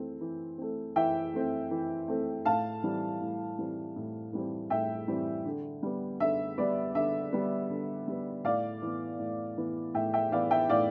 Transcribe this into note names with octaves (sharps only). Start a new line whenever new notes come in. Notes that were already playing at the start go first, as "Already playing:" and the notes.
Already playing: E3 A3 C4
E3
A3 C4
E3 E5 G5
A3 C4
E3
A3 C4
A2 F5 A5
E3 G3 C4
A2
E3 G3 C4
A2
E3 G3 C4
A2 E5 G5
E3 G3 C4
D3
G3 B3
D3 E5
G3 B3 D5
D3 E5
G3 B3
D3
G3 B3
A2 D5 F5
E3 B3
A2
E3 B3
A2 E5 G5
E5 G5
E3 B3 D5 F5
E5 G5
A2 D5 F5